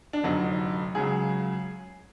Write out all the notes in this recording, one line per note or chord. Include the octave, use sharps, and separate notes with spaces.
D4
F1 F2 D3 F#3 D#4
C#2 C#3 F#3 G#4